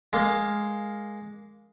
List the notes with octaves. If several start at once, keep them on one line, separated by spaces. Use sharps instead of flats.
G#3 A#3